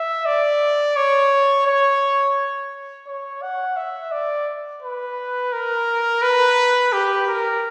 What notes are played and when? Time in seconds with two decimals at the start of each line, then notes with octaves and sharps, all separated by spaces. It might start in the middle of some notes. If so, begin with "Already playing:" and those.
Already playing: E5
0.26 D5
0.96 C#5
1.67 C#5
3.07 C#5
3.43 F#5
3.77 E5
4.12 D5
4.82 B4
5.53 A#4
6.22 B4
6.93 G4
7.27 A#4